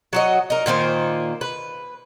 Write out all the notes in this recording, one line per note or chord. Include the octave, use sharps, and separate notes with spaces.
F#3 F#4 D#5
D#4 A#4
A#2 D#3 A#3 C5
B4